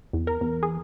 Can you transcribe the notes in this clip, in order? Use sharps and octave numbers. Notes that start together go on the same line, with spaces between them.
E2
A#4
E2
G#4